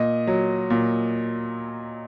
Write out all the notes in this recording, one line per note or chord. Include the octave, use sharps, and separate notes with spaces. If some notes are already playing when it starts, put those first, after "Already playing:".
Already playing: A#2 D#5
F#3
A#2